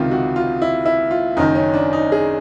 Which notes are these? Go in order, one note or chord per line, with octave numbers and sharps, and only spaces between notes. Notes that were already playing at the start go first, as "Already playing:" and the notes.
Already playing: C#2 C3 D#3 F4
F#4
F4
E4
E4
F4
F#1 F#2 D#3 D#4
C#4
D4
D#4
G#4